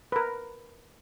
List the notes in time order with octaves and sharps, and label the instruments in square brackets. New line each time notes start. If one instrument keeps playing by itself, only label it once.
[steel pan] A#4 B4